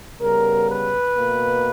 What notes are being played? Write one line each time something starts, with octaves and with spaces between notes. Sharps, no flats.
C#3 G3 B3 A#4
B4
B2 A#3